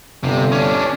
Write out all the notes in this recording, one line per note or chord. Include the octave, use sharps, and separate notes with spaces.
G1 C3
C#4 D4